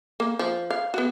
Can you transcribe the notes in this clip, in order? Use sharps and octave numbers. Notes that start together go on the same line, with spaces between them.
A#3
F3
F5
B3 F#4